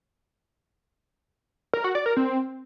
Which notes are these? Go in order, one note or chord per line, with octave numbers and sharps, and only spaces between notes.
A#4
F#4
D5
A#4
C4